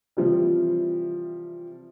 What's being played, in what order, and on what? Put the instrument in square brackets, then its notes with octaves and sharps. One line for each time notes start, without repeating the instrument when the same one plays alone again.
[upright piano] C3 E3 F3 G3